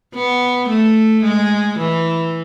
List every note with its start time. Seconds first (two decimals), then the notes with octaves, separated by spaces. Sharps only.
0.14 B3
0.68 A3
1.23 G#3
1.79 E3